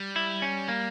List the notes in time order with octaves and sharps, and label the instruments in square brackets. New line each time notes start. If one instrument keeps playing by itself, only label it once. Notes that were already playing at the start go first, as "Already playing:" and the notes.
Already playing: [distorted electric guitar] G3
[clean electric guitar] E4
C#4
A#3